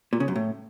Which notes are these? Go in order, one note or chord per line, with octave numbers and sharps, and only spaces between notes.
A#2
C#3
F#2
A2